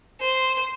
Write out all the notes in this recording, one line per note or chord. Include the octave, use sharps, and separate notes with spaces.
C5